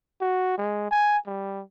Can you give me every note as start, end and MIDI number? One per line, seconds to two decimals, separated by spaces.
0.21 0.56 66
0.58 0.89 56
0.91 1.18 80
1.27 1.62 55